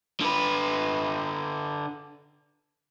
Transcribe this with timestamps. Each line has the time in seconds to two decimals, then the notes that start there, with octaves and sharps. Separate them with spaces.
0.21 D3 B4